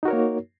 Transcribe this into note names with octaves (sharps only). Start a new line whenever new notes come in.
A#3 D#4 F#4 A#4 C#5